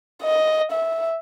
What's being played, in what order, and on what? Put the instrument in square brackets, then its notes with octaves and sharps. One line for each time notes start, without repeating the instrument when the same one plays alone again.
[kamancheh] D#5
E5